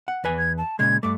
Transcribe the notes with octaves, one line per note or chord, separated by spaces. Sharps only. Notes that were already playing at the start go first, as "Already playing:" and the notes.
F#5
E2 B4 G#5
G#6
A5
A#2 C#3 G#3 G#6
G2 A3 D6